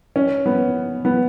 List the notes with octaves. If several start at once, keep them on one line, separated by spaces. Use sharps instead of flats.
C#4
B3
B3